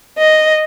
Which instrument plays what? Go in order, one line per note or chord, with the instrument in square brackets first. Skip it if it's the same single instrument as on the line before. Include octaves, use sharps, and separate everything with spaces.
[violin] D#5